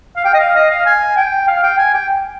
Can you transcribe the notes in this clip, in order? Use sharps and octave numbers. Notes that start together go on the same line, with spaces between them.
F5
G5
D#5
F5
D#5
F5
G#5
G5
F5
G5
G#5
G5